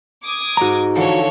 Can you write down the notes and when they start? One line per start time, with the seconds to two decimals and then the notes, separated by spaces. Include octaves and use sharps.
0.23 D6 D#6 G#6
0.57 G#2 F#4 D#5 A#5
0.95 D3 E3 F3 A4 C#5